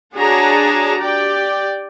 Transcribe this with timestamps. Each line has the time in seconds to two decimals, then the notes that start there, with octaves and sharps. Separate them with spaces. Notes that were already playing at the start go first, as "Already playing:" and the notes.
0.15 D4 F#4 G#4 C#5 A5 A#5
1.00 G4 D5 G5